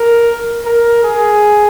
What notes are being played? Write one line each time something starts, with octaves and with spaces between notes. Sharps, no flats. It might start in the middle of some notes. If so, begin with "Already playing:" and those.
Already playing: A#4
A#4
G#4